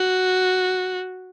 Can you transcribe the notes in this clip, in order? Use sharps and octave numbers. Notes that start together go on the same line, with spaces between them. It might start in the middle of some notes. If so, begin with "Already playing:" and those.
Already playing: F#4